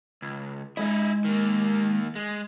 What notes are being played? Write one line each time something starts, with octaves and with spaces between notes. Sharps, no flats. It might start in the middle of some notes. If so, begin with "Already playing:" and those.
C#2
G#3 D#4 E4 D#5
D#3 A#3
G#3